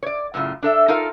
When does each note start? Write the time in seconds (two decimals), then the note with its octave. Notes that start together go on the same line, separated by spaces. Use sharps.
0.03 C#5 D5
0.34 F#2 A2 C#3 F4
0.62 D4 A4 E5
0.88 D#4 F4 A4 A#4 F5